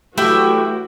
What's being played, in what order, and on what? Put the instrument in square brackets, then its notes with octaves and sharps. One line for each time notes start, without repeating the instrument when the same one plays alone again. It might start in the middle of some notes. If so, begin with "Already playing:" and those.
[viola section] E3 F#3 F#4 [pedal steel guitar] A3 [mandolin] E4 E5 G5 [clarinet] G4